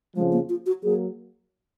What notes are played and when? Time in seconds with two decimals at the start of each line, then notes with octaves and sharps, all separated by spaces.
0.15 F2 C#3 F3 G#3
0.32 A#3
0.49 F4
0.66 F#4
0.83 F#3 A#3 G#4